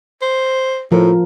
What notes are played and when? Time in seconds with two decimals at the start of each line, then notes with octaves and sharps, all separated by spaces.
0.22 C5
0.92 A2 F3 A#4